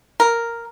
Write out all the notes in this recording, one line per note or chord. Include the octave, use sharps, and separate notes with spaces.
A#4